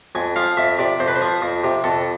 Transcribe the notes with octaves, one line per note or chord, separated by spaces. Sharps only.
F2 G#5
F3 F5
F2 E5
C3 D5
F2 C5
B4
C5
F3
F2
C3
F2 A4